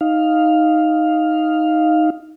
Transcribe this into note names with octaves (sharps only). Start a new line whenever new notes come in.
D#4 F5